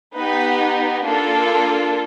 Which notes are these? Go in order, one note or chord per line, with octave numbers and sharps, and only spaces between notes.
B3 D#4 G4 B4
A#3 D4 F4 A4